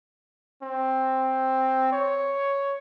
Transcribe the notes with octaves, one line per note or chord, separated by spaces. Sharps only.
C4
C#5